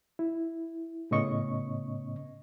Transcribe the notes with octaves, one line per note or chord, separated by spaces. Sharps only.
E4
A2 C#3 B3 C#4 D#5 C#6